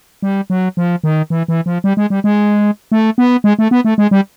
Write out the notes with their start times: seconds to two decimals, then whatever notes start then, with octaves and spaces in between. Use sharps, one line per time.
0.22 G3
0.50 F#3
0.77 F3
1.04 D#3
1.30 E3
1.48 E3
1.66 F3
1.84 G3
1.97 G#3
2.10 G3
2.24 G#3
2.92 A3
3.18 B3
3.44 G#3
3.59 A3
3.71 B3
3.85 A3
3.98 G#3
4.11 G3